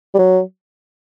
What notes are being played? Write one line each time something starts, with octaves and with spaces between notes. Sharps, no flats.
G3
F#3